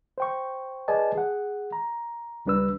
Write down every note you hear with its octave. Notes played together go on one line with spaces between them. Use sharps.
C5 G5 C#6
G#4 B4 D5 D#5 G#5 A5
G#4 F#5
A#5
C#2 G3 D4 B4 E6